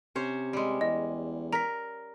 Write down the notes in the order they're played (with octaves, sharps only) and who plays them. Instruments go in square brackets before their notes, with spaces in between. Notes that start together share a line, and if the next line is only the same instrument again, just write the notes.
[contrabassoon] C3 [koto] C#4 C5 C#5
[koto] G3 G#3
[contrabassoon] E2 [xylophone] D#5
[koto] A#4 [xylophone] A#5 B6